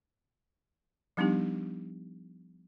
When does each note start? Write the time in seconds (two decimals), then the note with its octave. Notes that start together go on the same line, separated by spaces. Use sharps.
1.17 F3 G3 B3 D4 D#4 G4